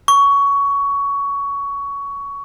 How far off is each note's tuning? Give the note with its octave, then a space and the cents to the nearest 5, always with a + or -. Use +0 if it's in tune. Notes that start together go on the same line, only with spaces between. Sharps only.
C#6 +15